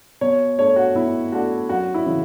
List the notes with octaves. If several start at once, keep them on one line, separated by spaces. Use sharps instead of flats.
B2 C#5
A3 D4 C#5
F#4
B2 E4
A3 D4 F#4
F#2 F#4
E4
C#3 E3